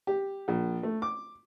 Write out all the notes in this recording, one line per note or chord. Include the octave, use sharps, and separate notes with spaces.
G4
A#1
A3
D6